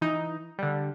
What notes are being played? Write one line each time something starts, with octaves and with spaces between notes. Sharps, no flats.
E3 D#4
D3 G3